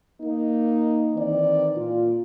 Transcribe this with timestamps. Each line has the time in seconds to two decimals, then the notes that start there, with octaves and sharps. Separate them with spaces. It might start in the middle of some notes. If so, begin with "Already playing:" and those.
0.21 A#3 D#4
1.15 D#3 E3 C4 D5
1.77 A#2 F4